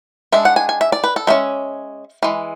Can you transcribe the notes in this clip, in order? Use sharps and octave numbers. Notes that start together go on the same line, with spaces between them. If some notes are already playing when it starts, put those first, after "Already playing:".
G#3 D4 E5
F#5
G#5
G#5
E5
D5
B4
A4
G#3 C#4 E5
E3 G#3